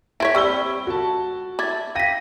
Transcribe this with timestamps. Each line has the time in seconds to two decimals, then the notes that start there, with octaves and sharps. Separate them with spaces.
0.20 E4 C5 C#5 E5 G#6 B6 D7
0.35 G3 C4 B5 C#6 E6 G7
0.87 F#4 A5
1.59 E4 D6 G#6 A6
1.95 F5 G5 A#6 B6 D#7